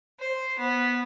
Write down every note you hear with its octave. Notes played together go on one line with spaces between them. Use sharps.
C5
B3